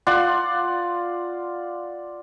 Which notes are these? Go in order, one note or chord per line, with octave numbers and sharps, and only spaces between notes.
F4 D5 F#5 C6